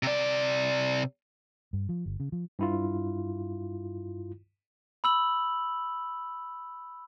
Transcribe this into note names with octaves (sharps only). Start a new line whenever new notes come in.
C3 D5
G2
F3
G1
C#3
F3
G2 E4 F4
B5 E6 F#7